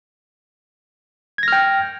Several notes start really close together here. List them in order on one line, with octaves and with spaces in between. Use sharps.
G#6 A#6 F6 G5